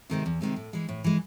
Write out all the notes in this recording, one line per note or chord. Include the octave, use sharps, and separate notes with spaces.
C3 D#3 G#3 C4
E2
C3 D#3 G#3 C4
A2
E3 G#3
A2
E3 G#3